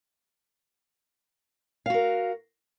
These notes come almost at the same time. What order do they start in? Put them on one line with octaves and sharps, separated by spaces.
F5 F#4 A#4